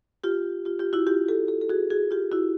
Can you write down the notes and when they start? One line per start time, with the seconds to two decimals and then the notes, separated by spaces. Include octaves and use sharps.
0.24 F4 G4
0.65 F4 G4
0.79 F4 G4
0.93 E4 F#4
1.07 F4 G4
1.28 G4 A4
1.48 G4 A4
1.61 A4
1.70 F#4 G#4
1.90 F#4 G#4
2.11 F4 G4
2.32 E4 F#4